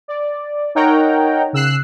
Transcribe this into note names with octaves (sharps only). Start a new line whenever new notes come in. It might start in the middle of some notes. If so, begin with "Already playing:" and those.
D5
D#4 A#4 C#5 F#5 G5 A#5
C#3 E6 F#6 C7